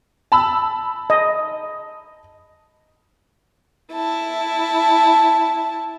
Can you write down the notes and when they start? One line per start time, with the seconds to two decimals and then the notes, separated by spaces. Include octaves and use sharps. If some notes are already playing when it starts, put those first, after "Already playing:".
0.32 A5 B5 E6
1.10 D#5
3.92 E4 A5